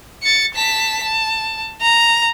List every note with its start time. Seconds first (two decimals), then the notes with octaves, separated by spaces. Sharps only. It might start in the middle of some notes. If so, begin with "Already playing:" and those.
0.23 A6 C#7
0.54 A5 B6
1.03 A5
1.81 A#5